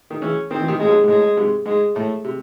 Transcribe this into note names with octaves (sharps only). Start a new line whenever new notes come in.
D#3
C#3 E3 C#4
D#3 C4
E3
C3 D#3
A2 C#3 G#3
G#2 C3
G#2
A2 G#3
G#2 C3
G#2 G#3
A2 A3
C3